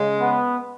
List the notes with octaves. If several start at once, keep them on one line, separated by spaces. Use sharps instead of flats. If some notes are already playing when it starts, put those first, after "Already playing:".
Already playing: C#3 G#3
B3